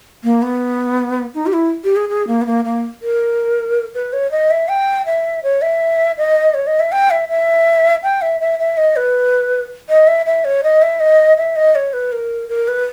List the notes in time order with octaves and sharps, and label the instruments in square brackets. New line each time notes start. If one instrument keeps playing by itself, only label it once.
[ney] A#3
B3
D#4
G4
E4
G4
G#4
G#4
A#3
B3
A#3
A#3
A#4
B4
C#5
D#5
E5
G5
E5
C#5
E5
D#5
C#5
D#5
E5
G5
E5
E5
G5
E5
E5
E5
D#5
B4
D#5
E5
E5
C#5
D#5
E5
D#5
E5
D#5
C#5
B4
A#4
A#4
B4